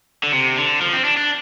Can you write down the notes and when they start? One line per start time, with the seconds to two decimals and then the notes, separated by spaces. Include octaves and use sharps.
0.23 D3
0.32 C3
0.57 D3
0.81 F3
0.93 C4
1.05 D4
1.17 D4